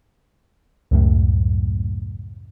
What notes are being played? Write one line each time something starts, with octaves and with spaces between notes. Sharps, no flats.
C#2 F#2 A2